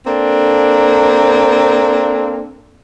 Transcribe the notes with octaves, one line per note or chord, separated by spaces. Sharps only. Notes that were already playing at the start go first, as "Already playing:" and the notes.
A#3 C4 D4 A4